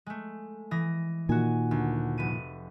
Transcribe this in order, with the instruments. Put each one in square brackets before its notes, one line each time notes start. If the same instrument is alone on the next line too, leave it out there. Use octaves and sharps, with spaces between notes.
[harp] G#3 A3
E3 D#6 A#6
[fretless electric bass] A#2 D#3 [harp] F#4 G#5
[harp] D2
F1 B4 D#7